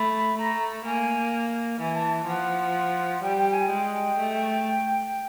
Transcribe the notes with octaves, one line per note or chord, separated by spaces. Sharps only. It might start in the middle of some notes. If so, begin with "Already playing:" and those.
Already playing: A3 B5
A3 A#5
A#3 G#5
E3 G#5
A5
F3 F#5
G3 G5
G5
G#5
G#3 G5
A3